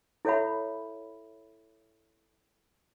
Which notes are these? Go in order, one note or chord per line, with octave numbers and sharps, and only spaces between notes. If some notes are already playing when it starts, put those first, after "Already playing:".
E4 A4 C#5 E5 F#5 B5